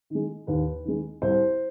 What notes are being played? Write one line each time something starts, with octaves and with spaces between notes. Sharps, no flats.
D#3 G#3
D#2 B4
D#3 G#3
C2 C5